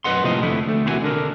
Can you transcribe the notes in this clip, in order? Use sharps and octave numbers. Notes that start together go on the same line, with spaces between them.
F#2 E3 B4 D#5 F#5 C6
A2 C3 F3 A#3 C5 D#5
F2 D3 A3 E4
D2 A3
D#2 C3 E3 F4 F#4 G#5
D3 D4 A#4